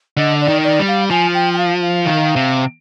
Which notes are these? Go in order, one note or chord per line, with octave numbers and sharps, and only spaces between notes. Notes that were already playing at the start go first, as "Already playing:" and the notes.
D3 D#5
D5
D#3
D5
G3
F5
F3 G#5
G5
G5
F5
F5
D#3
C3